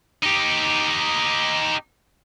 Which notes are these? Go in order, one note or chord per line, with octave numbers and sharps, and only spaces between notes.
D#4 G4